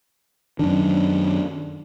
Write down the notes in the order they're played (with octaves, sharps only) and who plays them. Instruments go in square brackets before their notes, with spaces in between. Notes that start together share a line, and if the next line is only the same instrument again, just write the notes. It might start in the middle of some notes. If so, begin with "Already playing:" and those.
[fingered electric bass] F#2 D#3 [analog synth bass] D4